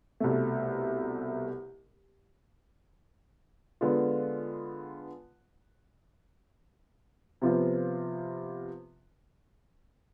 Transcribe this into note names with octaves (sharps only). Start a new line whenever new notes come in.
C2 B2 A3
D3 G#3 B3 F4
C3 F3 B3 F4